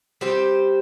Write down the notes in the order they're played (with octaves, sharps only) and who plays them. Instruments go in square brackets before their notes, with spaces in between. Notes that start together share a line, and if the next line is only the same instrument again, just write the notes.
[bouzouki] G3 C4 G4 C5